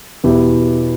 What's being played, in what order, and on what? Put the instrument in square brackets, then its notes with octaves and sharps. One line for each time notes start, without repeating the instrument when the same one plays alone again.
[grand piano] E2 B2 B3 E4 G4